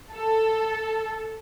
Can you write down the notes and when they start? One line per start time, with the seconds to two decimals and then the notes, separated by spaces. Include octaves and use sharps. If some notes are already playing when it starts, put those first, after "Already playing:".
0.11 A4